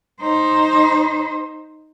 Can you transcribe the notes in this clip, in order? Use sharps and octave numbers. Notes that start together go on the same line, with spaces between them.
D#4 C5